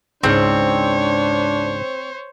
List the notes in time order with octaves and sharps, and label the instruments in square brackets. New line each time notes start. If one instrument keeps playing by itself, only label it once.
[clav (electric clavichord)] C#2 G#2 [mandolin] C4 [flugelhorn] D4 [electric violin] C5 C#5